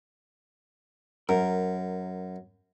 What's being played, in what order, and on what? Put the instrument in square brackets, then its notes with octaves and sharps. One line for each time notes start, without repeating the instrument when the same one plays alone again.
[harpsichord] F#2 [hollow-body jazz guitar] A#4